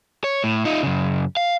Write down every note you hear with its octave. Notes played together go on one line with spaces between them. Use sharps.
C#5
A2
D#4 F4
F#2 C#3
F5